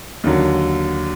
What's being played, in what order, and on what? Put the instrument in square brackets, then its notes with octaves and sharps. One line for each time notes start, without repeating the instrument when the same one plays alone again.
[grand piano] D#2 D3 F#3